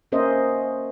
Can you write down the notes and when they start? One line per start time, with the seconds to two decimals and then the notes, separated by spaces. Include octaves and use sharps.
0.12 A#3 C#4 A#4 C5 D#5 E5